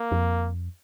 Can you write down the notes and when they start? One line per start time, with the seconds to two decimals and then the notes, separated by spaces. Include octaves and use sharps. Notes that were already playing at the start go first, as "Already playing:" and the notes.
Already playing: A#3
0.12 F2